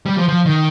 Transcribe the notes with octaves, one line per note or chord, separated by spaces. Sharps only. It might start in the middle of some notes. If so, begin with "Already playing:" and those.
G3
F3
F3
D#3